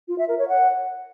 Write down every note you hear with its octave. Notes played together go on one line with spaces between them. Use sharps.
F4
E5
A#4
C#5
F#5